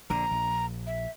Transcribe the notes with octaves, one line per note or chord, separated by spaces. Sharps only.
A#1 D3 A#5
A#1
E5